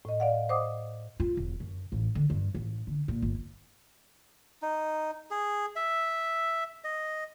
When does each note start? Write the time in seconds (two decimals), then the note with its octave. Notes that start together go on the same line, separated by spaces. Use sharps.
0.05 A2 D#5
0.20 D5 F5 F#5
0.49 C5 D#5 F#5 D6 D#6
1.20 F4
1.37 E1
1.60 F#2
1.92 A1
2.15 D3
2.30 G2
2.55 A1
2.87 D3
3.08 A#2
3.22 G1
4.62 D#4
5.31 G#4
5.76 E5
6.84 D#5